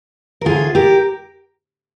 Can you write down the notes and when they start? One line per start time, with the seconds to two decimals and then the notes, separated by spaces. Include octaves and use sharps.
0.41 A#4
0.45 D2 D3 F4 G#4
0.75 G4 A#4